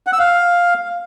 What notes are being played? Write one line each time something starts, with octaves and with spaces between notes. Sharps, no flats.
F#5
E6
F5